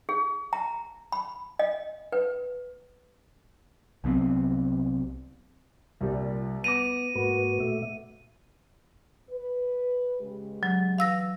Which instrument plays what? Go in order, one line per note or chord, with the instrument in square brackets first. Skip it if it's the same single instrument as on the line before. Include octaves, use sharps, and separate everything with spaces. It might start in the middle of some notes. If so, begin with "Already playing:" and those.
[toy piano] G#4
A#5
B5
D#5
B4
[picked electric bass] C2 F#3 B3 C4
[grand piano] C2 G3 [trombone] A#2
[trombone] B3 [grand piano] D6 A#6 F7 [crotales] D#7
[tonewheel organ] G#2 A#3 B4 [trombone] F#4
[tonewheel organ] A#2 A3 E5
[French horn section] B4
C#3 G#3 G4
[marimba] F#3
[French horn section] E3 [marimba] F5 E6 A#6